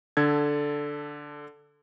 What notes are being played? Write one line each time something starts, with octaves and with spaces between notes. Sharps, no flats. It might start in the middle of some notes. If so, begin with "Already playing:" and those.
D3 A4 G#6